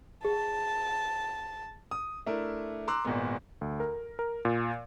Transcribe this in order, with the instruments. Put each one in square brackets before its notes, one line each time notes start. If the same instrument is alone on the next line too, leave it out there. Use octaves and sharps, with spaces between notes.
[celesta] G#4 [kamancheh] A5
[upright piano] D#6
A3 D4 E4 A#4
A#5 C6 D6 E6 F#6
G#1 A#2 G#3 B3
[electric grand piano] D2
A#4
A#4
A#2